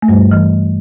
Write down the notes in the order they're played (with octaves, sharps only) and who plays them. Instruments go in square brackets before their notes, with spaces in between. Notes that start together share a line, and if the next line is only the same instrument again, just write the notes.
[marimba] A3
G2 G3
E3